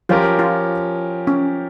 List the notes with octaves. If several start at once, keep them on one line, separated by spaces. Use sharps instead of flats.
F3 C#4 F4 G4 A#4
F4
C#4